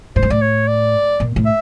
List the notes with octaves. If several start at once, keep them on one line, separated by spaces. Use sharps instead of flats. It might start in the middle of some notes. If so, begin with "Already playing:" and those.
A2 C5
G#2
A2 D5
C#5
D5
A#2
A2
E5